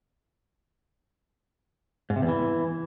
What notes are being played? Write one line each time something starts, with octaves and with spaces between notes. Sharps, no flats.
G#2
C3
E2
E3